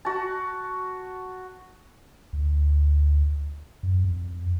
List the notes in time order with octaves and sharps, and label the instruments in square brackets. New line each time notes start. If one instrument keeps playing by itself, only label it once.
[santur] F#4 A5
[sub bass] D2
F#2
F2